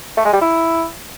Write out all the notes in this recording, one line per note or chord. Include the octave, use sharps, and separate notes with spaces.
A3
G#3
G3
E4